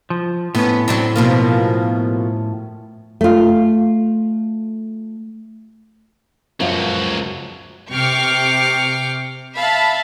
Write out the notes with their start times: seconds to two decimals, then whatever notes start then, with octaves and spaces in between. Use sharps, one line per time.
0.10 F3
0.55 A2 B3 C#4
0.88 F#3 C4 D4
1.16 B2 F3 A#3
3.21 A3 F4
6.60 C#2 F#2 F3 F#3
7.91 C3 G5 C#6 D6 F6 C7
9.57 E5 F5 A5 B5